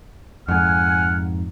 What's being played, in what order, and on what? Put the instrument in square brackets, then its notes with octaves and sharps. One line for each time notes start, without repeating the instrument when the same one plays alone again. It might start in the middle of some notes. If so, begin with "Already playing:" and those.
[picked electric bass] F2 G#2 [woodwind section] F#5 G#5 F6